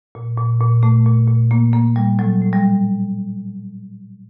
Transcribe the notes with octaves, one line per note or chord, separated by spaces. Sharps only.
A#2
A#2
A#2
A#2 A3
A#2
A#2
A#2 A#3
A#2 A#3
A#2 G3
A2 F#3
A2
G3